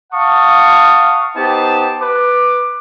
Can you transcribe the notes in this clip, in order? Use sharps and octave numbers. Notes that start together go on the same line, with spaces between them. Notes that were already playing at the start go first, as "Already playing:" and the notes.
F5 F#5 A5 C#6 D#6
B3 D#4 G4 C5 A5
B4 D6